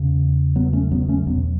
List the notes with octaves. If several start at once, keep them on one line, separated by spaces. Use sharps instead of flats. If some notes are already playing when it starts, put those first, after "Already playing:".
Already playing: E2 C#3
F#3 B3
A3 C#4
F#3 B3
A3 C#4
E2 B2 F#3 B3